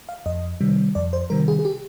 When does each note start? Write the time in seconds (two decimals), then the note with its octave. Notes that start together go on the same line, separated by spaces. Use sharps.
0.09 F5
0.26 F2 D#5
0.61 C3 D#3 G3
0.95 F2 D5
1.13 C5
1.30 C3 D#3 G3 A#4
1.48 G#4
1.59 G#4
1.65 G4